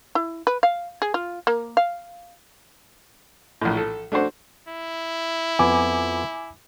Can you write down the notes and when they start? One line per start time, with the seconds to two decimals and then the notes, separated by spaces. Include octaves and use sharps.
0.15 E4
0.47 B4
0.63 F5
1.02 G#4
1.14 F4
1.47 A#3
1.77 F5
3.62 A#1 A2
3.77 A4
4.12 A3 D4 F#4 C5
4.68 E4
5.59 F2 B3 G#5 D6